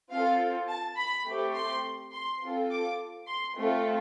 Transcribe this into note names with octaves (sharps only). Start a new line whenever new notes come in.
C4 F4 A4 F5
A5
B5
A3 C4 G4
C6
C6
C4 F4 A4
D6
C6
A3 C4 F4 A4